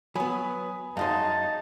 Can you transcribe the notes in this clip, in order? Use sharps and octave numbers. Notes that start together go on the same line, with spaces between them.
F#3 B3 G#5 B5 D#6
F#2 G#3 D#4 F5 A5 C6